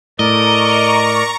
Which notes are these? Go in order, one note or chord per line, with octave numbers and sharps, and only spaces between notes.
A2 A#4 D5 D#5 A#5 C#6